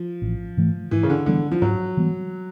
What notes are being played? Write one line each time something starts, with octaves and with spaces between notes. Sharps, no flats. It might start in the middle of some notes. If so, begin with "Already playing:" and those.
Already playing: F3
A1
G#2 E3 A3
G#2 E3
C#3
D3
D3 E3 G3 B3
F3
G#2 F#3
E3 G3 B3